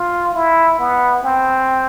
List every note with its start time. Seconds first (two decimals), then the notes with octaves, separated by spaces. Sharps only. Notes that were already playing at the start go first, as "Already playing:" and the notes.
Already playing: F4
0.35 E4
0.79 B3
1.23 C4